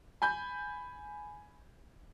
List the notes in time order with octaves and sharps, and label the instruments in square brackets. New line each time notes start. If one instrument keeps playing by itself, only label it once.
[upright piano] G#5 B5 G6